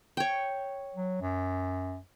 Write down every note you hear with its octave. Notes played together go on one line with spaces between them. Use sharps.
C#5 G5
F#3
F#2